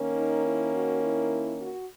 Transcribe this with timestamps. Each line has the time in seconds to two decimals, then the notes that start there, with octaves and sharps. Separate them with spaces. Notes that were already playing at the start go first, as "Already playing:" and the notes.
Already playing: D#3 A#3 C#4
0.16 D#4
0.45 E4
0.74 F#4
1.02 E4
1.61 F#4